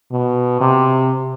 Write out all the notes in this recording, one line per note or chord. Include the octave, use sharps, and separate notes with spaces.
B2
C3